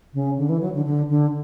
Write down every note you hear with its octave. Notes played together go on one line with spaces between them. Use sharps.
C#3
D3
E3
F#3
D3
D3
D3